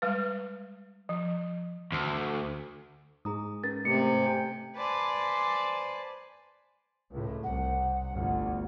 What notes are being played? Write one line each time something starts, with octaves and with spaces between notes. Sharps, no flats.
G3 G#3 B4
F3
D2
G#2 G#4 A#5 D#6
C#4 A#4 B4 A6
C3 A3 C#7
G5 G#5
B4 C5 D5 G#5 A5
C#2 A2
C2 F#5
G1 D2